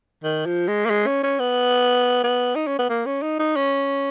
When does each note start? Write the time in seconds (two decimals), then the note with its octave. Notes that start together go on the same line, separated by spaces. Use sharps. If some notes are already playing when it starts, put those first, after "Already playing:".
0.24 D#3
0.46 F3
0.68 G#3
0.86 A#3
0.90 G#3
1.07 C#4
1.24 C#4
1.40 B3
2.24 B3
2.56 D#4
2.67 C#4
2.79 B3
2.90 A#3
3.06 C#4
3.22 D#4
3.39 D#4
3.56 C#4